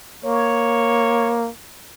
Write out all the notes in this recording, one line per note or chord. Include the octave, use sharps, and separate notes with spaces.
A#3 C#5